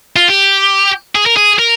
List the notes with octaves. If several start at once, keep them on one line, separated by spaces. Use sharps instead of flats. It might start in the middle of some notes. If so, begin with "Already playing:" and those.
F4
G4
G#4
A#4
G#4
A#4